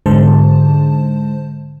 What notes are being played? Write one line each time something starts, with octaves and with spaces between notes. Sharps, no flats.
G#2 D3 G#3 C5 A5